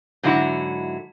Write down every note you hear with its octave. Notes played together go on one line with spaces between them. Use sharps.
G#2 D3 F#3 E4 F#4